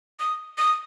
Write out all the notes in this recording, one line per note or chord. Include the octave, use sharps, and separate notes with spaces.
D#6
D#6